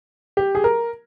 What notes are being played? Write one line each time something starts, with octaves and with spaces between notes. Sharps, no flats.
G4
G#4
A#4